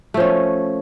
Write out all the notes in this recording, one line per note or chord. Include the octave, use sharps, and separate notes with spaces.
F3 A3 C#4